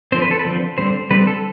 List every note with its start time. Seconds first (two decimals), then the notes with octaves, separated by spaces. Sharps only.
0.12 D3 F3 C4 C5
0.22 B4
0.31 A4
0.39 B4
0.45 D3 F3 C4
0.78 D3 G3 C4 C5
1.10 D3 G3 C4 B4
1.27 A4